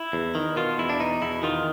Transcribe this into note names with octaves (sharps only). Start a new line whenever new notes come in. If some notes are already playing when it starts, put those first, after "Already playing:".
Already playing: E4
E2
D#3
B2 F4
E2 E4
D4
B2 D#4
E2 E4
D#3 F4